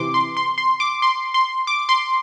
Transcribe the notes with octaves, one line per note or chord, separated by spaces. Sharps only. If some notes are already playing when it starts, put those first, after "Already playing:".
Already playing: C3 E3 C6 D6
C6
C6
C6
D6
C6
C6
D6
C6